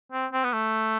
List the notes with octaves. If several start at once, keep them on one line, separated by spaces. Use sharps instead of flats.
C4
C4
B3
A3